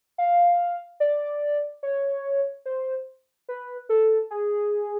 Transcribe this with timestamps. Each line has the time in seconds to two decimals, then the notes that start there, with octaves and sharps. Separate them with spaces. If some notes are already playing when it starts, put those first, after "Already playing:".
0.18 F5
1.00 D5
1.83 C#5
2.66 C5
3.49 B4
3.89 A4
4.31 G#4